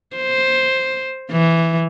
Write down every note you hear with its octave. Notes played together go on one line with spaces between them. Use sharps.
C5
E3